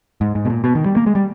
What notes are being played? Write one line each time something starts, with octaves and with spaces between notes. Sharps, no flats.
G#2
G#2
B2
A#2
B2
D#3
G3
A#3
G#3
G3